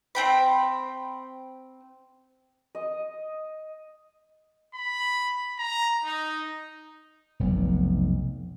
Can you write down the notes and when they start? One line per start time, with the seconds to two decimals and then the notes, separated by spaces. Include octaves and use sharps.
0.15 C4 G5 B5
2.75 D#5
4.74 B5
5.59 A#5
6.04 D#4
7.40 F1 B1